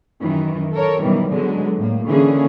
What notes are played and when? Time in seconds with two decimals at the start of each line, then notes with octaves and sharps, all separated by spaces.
0.21 F#2 D#3 E3
0.73 A4 A#4 C#5
1.02 F#2 B2 D#3 E3 G3
1.31 D3 F#3 G#3 B3
1.77 A2 A#3
2.07 D3 E3 A#3 C#4 G#4